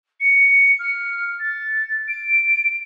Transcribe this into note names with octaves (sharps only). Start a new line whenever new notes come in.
C#7
F6
A6
D7